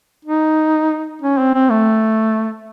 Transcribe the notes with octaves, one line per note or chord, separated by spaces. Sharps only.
D#4
C#4
C4
C4
A3